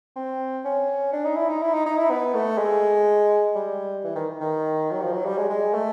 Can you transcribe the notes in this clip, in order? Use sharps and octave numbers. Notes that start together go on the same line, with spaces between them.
C4
C#4
D4
D#4
E4
D#4
E4
D#4
D#4
E4
B3
A3
G#3
G3
E3
D#3
D#3
F#3
F3
F#3
G3
G#3
G#3
A3